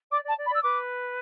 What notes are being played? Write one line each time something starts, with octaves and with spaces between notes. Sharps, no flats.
D5 D6
D5
A5
D5
B5
D5
E6
B4 D6